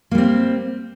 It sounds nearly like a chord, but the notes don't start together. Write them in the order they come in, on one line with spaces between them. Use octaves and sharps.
A#3 G3 C4